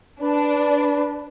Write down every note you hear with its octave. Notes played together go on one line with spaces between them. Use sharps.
D4 B4